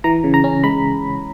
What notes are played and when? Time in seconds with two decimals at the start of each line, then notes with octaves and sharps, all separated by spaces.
0.04 E3 A#5
0.24 C#3
0.34 A#5
0.44 C#4
0.64 G#3 B5